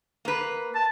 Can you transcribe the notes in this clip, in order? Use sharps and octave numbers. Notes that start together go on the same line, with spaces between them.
A#3 B4
A5